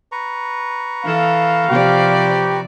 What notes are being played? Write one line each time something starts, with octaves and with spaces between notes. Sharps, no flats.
B4 A#5 C#6
E3 A4 F5
C3 F3 G4 D5